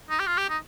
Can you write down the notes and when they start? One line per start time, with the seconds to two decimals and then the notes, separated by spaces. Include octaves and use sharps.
0.09 D#4
0.19 G4
0.27 F4
0.38 G4
0.49 D#4